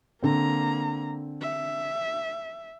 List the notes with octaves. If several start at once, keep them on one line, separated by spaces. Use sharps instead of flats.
D3 A#3 C4 A#5
E5